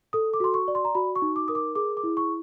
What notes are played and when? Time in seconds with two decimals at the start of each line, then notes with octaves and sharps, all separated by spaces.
0.13 A4 D#6
0.34 D6
0.40 F#4 C6
0.54 C#6
0.68 D5
0.75 C6
0.85 A#5
0.95 F#4 B5
1.16 C#6
1.22 D#4
1.36 D6
1.48 A#4 D#6
1.55 D6
1.75 G#4 D6
1.97 D6
2.03 E4
2.17 C#6